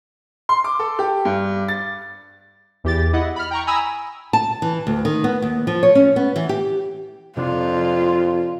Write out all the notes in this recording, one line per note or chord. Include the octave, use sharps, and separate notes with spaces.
C6
D6
A4
G4
G2
A6
E2 G4 A6
E4 D#5 F#5
B5 F6
G5 A#5 C#6
G#5 A#5 B5 D#6 E6
A5
E3
D2
D#3
B3
D#2
F3
C#5
C#4
B3
E3
G4
F2 C3 D4 F4